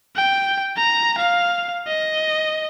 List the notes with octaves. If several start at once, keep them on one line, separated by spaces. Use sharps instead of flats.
G5
A#5
F5
D#5